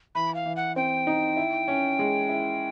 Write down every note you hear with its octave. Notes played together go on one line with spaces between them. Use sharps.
E3 B5
F5
E3
F#5
C4 G5
D#4
E4
C#4
G#3
E4